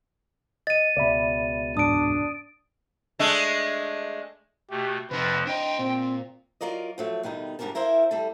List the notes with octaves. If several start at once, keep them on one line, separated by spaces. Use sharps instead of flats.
D#5 A6 D#7
C#2 B2 D5 E5 B5
E2 G#2 D4 D#6 D7
G#3 A3 D4
B2 A3 G4
F2 C3 F3 D#4 B4
D4 C5 D#5 G5
A#2 C4
F#3 F4 A#4 D5 D#5
F3 F#3 A3
B2 D#3 G3 D#4
D2 G#2 G3 D4 A#4 A5
E4 A#4 C5 E5 F5
G3 A3 A4